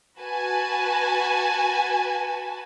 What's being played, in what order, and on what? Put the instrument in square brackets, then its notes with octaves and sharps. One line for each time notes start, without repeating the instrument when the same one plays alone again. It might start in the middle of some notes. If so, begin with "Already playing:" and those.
[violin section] F#4 B4 G#5 A5